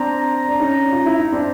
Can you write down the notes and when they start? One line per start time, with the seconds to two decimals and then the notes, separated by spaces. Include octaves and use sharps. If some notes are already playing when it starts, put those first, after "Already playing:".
Already playing: C4 D4 A#5
0.49 D4
0.60 C#4 D#4
0.92 F4
1.06 E4
1.19 D#4
1.32 C4 D4